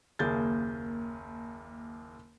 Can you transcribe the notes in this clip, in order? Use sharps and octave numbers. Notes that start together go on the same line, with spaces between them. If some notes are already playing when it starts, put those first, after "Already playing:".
F#1 D#2 A#3 G#4 G6 A6